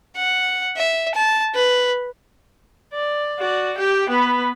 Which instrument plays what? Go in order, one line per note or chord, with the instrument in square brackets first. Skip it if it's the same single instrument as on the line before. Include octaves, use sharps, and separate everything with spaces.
[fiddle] F#5
E5
A5
B4
[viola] D5
F#4 D5
G4 G5
B3 B4